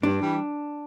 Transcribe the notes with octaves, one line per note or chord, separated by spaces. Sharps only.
G2 D4
E3 G3